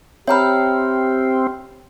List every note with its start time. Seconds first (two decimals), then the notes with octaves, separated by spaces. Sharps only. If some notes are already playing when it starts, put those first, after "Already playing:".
0.28 C4 G4 C#5 E5 G5 A#5 B5 F6